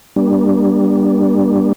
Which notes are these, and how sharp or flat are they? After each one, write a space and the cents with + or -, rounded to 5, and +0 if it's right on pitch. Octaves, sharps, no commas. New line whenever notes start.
G3 +0 A#3 +45 D4 +0